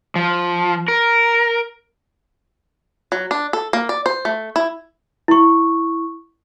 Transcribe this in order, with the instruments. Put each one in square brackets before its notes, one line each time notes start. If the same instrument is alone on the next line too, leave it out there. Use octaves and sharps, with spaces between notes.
[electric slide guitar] F3
A#4
[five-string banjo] F#3
D4
A4
A#3
D5
C5
A3
E4
[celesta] E4 C#6